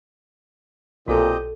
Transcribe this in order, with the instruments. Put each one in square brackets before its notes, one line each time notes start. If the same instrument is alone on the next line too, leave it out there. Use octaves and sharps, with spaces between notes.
[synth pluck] B1 [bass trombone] A#2 [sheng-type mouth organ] C4 G4 D#5 [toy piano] F#4 A4 A5